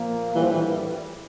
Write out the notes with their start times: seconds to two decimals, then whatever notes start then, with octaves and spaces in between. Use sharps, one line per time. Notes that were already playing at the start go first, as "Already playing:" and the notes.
Already playing: A#2 F3 A#3
0.35 A#1 A2 E3 G3
0.43 F3
0.51 E3